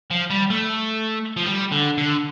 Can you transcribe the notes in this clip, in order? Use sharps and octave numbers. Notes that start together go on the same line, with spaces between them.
F3
G3
A3
F3
G3
D3
D3